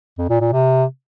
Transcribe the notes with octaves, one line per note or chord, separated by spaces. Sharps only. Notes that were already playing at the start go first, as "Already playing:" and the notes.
F2
A#2
A#2
C3